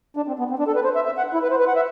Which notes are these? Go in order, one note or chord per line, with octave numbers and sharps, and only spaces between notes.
D4
C4
B3
C4
D4
A4
B4
C5
E5
E5
F#5
E4
B4
C5
B4
F#5
E5